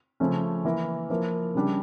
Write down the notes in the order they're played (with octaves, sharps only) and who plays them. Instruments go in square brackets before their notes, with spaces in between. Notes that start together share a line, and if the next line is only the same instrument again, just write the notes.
[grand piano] C#3 F3 A3 C#4
E3 A#3 E4 A#4
F3 A#3 E4 A#4
C#3 G3 D4 G4